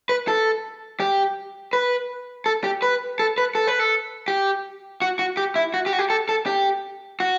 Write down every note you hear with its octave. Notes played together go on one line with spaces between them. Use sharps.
B4
A4
G4
B4
A4
G4
B4
A4
B4
A4
B4
A4
G4
F#4
F#4
G4
E4
F#4
G4
F#4
G4
A4
A4
G4
F#4